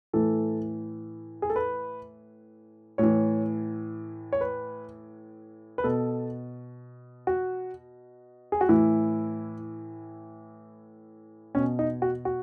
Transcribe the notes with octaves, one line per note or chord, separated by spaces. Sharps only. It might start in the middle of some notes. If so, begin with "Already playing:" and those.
A2 E3 A4
G#4
A4
B4
A2 E3 C#5
C#5
B4
B4
B2 A4
F#4
G#4
F#4
A2 E3 E4
B2 C#4
D#4
F#4
F#4